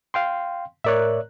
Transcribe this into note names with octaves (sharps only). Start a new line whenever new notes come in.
F5 G5 C6
A2 A#4 C#5 D5 E5 F#6